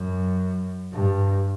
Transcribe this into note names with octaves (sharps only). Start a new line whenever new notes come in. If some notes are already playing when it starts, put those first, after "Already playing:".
Already playing: F#2
G2